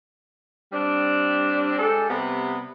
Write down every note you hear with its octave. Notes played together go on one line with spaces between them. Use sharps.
G3 C4 D4
G#3 G4 A4
C3 G3 B3